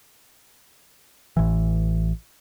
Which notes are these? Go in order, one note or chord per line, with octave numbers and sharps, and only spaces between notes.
A1 E3